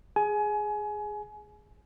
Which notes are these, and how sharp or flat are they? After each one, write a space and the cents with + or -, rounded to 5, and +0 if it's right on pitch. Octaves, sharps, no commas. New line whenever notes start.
G#4 +0 G#5 +25